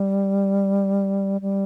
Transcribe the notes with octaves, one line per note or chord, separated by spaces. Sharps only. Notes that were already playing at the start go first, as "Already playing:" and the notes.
Already playing: G3
G3